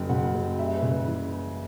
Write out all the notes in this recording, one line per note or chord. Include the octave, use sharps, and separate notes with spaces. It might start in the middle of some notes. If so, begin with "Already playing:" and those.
Already playing: F#1 F#2 G5
C#3 F#5
F#1
G3 E5
B4
C#3
B4
E3